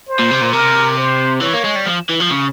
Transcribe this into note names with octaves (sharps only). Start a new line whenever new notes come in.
C5
A#2
C3
A#2
C3 A#4
C5
E3 C#5
A#3
G#3
G3
F3
E3
F3
C#3